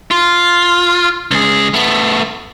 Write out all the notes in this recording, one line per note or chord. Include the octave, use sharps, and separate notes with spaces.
F4
C#2 G#4
A3 B3